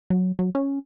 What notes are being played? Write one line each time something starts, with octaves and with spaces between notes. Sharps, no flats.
F#3
F#3
C#4